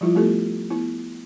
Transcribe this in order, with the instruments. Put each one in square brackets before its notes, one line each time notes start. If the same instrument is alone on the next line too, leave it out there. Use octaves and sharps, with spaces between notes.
[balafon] F3 G3 E4 F4
A3 B3 E4 G4 A4
B3 E4